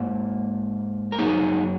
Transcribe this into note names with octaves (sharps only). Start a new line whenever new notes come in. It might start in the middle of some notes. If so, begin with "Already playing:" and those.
Already playing: G#2 A#3
A#4
F#2 F#3 A#3 D#4 G#4